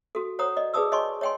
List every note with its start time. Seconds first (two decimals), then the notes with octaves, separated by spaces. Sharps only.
0.15 F#4 A4
0.39 C5 C#5 F#5 A#5 D#6
0.57 D5 D#5
0.74 G#4 B4 D5 A5 D#6 E6
0.92 C#5 D#5 G#5 A5 C6 C#6
1.21 C#5 D#5 G5 G#5 C6